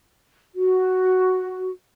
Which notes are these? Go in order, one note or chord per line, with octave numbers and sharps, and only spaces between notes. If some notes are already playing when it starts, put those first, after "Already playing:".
F#4